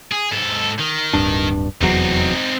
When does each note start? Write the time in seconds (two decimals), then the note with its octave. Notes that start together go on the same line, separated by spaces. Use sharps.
0.12 G#4
0.31 G#2 A4
0.79 D#3
1.13 D1 G2 D4
1.81 F1 E2 F#3 C4 D#4